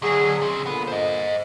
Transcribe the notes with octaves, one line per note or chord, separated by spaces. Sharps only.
D3 F#3 G#4
C#3 C4
A#2 D3 B3
C5 D#5